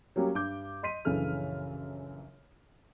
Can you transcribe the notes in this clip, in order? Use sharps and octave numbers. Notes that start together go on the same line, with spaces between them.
F#3 G3 A#3 C#4 G4
G2 D6 G6
D#5 C6 B6 D#7
A#1 F#2 C#3 E3 A4 F6